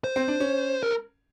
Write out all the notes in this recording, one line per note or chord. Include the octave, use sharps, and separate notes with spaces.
C5
C4
D4
C#4
A#4